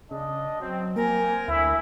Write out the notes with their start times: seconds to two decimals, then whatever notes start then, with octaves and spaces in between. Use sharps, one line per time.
0.11 C#3 D4 D#5
0.60 F#3 C4
0.96 A#3 C4 A#4 G#5
1.48 D2 E4